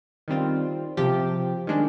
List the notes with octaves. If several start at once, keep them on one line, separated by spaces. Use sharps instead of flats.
D#3 G3 C4 F4
C3 F3 C4 G4
D#3 G#3 D4